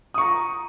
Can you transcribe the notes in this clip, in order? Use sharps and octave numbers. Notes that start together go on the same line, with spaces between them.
A#5 C#6 D#6